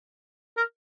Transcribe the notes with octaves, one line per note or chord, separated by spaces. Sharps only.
A#4